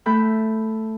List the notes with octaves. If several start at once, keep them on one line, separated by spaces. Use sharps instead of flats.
A3 A4 G5 B5 F#6 G6